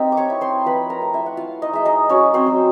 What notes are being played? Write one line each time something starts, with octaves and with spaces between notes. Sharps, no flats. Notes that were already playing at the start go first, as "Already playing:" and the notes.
Already playing: C4 D#4 G4 G5
D6
C#5 C#6
E4
C5 C6
F3 B4 B5
A#4 A#5
A3
E4 E5
F#5
E4 F4 F5
D#4 D#5
G#3 E5
D#4 D#5
F#3 C#4 C#5
C4 C5
F#3